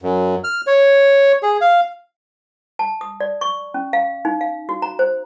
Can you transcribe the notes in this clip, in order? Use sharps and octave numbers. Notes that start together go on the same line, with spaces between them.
F#2
F6
C#5
G#4
F5
A5
D#6
D5
C#6
C#4
F5
D#4
F5
F#4
A#5
C5